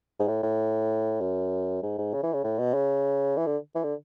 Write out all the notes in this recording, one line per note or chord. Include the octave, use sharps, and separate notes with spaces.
G#2
A2
A2
F#2
G#2
G#2
C#3
E3
C#3
A2
B2
C#3
E3
D3
E3
D3